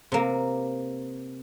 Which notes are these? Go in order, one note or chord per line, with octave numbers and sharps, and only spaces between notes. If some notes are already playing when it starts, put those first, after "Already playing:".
C3 A#3